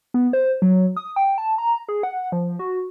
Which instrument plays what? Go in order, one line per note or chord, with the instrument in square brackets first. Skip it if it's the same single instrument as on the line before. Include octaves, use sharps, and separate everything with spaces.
[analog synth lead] B3
C5
F#3
D#6
G5
A5
A#5
G#4
F#5
F3
F#4